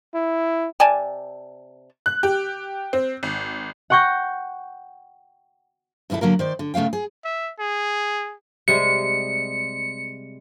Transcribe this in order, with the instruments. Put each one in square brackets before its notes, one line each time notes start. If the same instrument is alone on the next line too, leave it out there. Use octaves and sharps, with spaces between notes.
[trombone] E4
[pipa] C3 D5 G#5 A5
[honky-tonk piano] F#6
G4
C4
G#1
[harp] F#5 G5 C#6 G6 A#6
[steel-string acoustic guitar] D#2 B2 C#4 E4 A4
D3 F#3 A#3 A#4
D#3 C5 D5
D3
C#3 A3 B3 F5 G5
G#4
[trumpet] E5
G#4
[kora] C3 G3 G#3 [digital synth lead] C#7